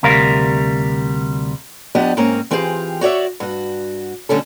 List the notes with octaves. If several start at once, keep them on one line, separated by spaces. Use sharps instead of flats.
D2 C3 G3 A#4 F5
F3 B3 D4 G4 D5 D#5
G#2 A#3 C4 C#4 A#5
E3 C4 F4 G4 G#4
F#4 C#5 D5 E5
G2 F#4
D2 D3 G3 C#4 A4